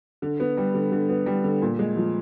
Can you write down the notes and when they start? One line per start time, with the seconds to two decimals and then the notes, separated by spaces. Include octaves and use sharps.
0.22 D3
0.40 B3
0.57 G3
0.75 D3
0.92 D3
1.09 B3
1.26 G3
1.44 D3
1.62 A#2
1.79 G#3
1.96 F3